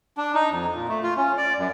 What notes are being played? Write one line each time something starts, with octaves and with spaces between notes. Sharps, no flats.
D4
D#4
F2
A#2
A3
F4
C#4
D5
F#2